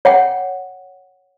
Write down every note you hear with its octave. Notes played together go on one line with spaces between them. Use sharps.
C#5 F#5 G5